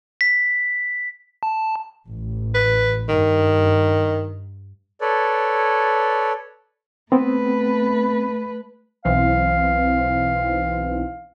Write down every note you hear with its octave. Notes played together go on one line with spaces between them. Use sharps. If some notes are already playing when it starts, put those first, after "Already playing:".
B6
A5
A1
B4
G2 D#3
A4 B4 C#5 D5
A3 B3 C4 B4
B1 E3 C4 F5